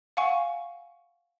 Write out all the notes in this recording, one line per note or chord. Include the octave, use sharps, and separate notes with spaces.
F5 F#5 G#5 C#6